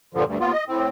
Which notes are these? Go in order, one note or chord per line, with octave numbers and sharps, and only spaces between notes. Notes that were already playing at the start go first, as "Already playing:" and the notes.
G2 A#2 D3 F3
D2 G2
D#2 B3 F4
D#5
A2 C4